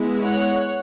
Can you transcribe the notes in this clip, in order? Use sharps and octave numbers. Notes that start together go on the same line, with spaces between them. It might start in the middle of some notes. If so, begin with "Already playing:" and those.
Already playing: G#3 B3 E4
C#5 F#5